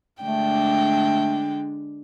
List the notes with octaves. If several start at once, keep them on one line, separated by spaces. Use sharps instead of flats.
D3 G#3 A3 D4 G5